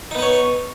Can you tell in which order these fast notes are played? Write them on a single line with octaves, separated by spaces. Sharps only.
D#4 B3 B4 C#5